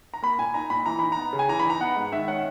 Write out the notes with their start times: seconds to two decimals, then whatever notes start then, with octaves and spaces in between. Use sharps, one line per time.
0.14 A#5
0.22 A#3 B5
0.39 A#2 G#5
0.54 D#4 A#5
0.70 A#2 B5
0.86 E3 A#5
0.99 D#4 B5
1.12 A#5
1.17 B3
1.33 C#3
1.39 G#5
1.49 E3 A#5
1.59 B5
1.65 D#4 A#5
1.80 B3 F#5
1.97 G#2
2.12 D#3 E5
2.28 C#4 F#5